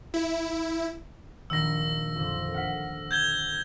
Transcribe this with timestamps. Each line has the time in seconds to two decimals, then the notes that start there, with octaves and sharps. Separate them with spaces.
0.14 E4
1.50 A#1 D#3 E6 A#6
2.16 F2 D3
2.54 F#5 F6 B6
3.11 G6 G#6 G7